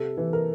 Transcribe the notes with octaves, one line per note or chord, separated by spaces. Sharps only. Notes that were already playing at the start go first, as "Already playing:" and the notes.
Already playing: C3 A4
E3
A#4